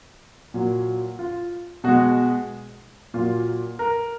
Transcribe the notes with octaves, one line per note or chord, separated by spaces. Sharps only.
A#2 F#3
F4
B2 G#3 F#4
A#2 F#3 F4
A#4